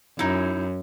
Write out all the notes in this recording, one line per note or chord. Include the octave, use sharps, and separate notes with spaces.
F#2 D#4 E4